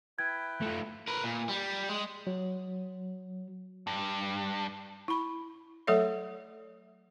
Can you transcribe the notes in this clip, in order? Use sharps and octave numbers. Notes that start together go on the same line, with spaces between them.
E4 B4 G5 G#6
A3 F4
A#4 B4
A#2
G3
G#3
F#3
G2
E4 B5
F#3 A3 A4 C#5 E5